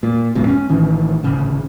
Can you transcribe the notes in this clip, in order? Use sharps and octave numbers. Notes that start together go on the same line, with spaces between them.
A#2
F1 A#1 G#2 B2
C#4
A1 D#3 E3
D1 G#1 C#3